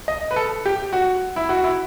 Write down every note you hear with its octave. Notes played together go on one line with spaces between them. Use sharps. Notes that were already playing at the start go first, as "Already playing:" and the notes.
D#5
B4
A4
G4
F#4
E4
F#4
E4